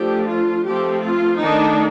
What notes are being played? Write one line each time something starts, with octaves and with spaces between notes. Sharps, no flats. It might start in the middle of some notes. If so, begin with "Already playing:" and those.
Already playing: F3 A3 D4 G4
F4
F3 A3 C4 G4
F4
D#3 A3 D4 D#4